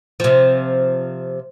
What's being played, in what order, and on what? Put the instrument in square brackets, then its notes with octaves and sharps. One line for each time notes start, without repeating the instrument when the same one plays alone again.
[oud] C3 F3